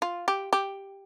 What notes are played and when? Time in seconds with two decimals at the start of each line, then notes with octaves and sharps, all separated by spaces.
0.02 F4
0.28 G4
0.53 G4